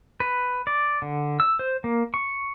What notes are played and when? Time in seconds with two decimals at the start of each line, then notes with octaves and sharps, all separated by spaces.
0.20 B4
0.67 D5
1.02 D3
1.40 E6
1.59 C5
1.84 A#3
2.14 C#6